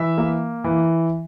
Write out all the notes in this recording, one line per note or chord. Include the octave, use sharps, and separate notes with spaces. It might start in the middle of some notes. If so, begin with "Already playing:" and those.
Already playing: E3 E5
A#3
E3